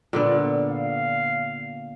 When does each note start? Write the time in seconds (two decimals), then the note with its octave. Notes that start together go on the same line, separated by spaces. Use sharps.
0.13 A#2 D3 B3
0.70 F5